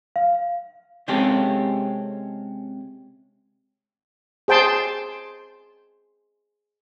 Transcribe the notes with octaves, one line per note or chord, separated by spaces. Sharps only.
F5
C3 G#3 C4 C#4 G4 A4
G#4 C5 G5 A5 C6